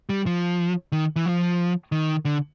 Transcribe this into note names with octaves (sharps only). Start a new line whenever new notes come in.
G3
F3
D#3
E3
F3
D#3
D3